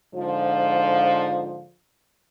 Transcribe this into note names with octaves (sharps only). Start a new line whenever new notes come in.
G#2 D3 F3